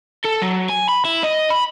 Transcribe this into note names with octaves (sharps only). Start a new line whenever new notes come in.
A4
F#3
G#5
B5
E4
D#5
B5